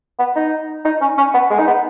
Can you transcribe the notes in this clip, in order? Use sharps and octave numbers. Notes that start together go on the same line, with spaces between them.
B3
D#4
D#4
C#4
C#4
B3
G#3
D#4
B3